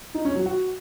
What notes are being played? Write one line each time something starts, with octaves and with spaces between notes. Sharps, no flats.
D#4
C#4
F#3
F#4